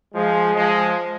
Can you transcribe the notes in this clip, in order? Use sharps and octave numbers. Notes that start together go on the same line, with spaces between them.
F3 G#3
F3 G#3